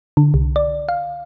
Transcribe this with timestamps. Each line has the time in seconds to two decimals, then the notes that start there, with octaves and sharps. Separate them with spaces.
0.17 D3
0.34 C2
0.56 D5
0.89 F5